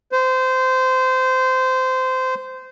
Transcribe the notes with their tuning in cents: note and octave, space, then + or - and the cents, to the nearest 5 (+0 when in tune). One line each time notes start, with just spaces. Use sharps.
C5 -20